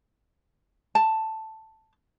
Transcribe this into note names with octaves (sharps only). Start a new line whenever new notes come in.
A5